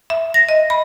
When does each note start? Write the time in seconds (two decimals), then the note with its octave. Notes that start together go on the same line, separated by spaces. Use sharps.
0.10 E5
0.34 A#6
0.49 D#5
0.70 B5